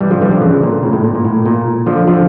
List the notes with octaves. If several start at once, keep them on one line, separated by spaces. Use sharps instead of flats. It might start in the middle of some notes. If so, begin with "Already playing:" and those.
E3 G3
D3 F3
E3 G3
D3 F3
C#3 E3
A#2 D3
A2 C#3
A2
A#2
A#2
A2
A#2
D3 F3
D3 F3